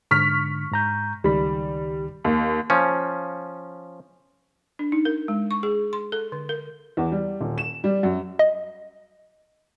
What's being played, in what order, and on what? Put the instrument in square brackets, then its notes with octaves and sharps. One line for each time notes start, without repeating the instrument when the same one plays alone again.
[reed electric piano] G#2 D3 [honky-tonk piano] C#6 F6 B6
[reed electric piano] G#2 A#5 G6
[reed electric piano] C#2 D#3 B5 [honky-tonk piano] G3
[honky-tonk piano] D#2
[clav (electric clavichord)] F3 C#4
[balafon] D4
D#4
A#4
G#3
C#6
G#4
C6
A4
D3
A#4
[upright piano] E2
G3
D#1
E7
G3
F#2
[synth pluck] D#5